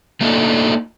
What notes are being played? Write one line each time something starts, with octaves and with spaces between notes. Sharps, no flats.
A3 A#3 D4 D#4 F4 A4